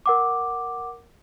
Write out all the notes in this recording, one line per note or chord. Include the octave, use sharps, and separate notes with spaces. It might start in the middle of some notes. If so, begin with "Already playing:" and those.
A#4 F#5 D6